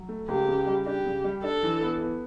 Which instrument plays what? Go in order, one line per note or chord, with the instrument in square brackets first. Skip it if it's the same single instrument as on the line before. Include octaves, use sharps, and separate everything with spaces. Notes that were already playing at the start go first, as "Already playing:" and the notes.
Already playing: [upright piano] F#3
A3
[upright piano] C#2 [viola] G4
[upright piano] C#3
G3
[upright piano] D4 [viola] G4
[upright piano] C#3
G3
[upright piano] D4 [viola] A4
[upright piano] E3
B3
B3